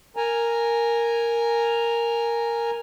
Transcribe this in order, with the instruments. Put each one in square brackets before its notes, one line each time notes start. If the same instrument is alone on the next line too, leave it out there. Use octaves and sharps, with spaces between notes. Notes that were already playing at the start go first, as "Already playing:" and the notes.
[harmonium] A#4 G#5 A#5